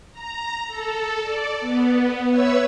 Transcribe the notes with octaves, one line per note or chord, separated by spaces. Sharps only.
A#5
A4
D5
B3
B4 C#5 E5 E6